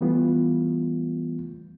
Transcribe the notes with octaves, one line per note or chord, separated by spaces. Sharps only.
E3 G3 A3 B3 F4